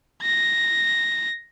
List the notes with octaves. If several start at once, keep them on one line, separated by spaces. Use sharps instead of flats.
A#6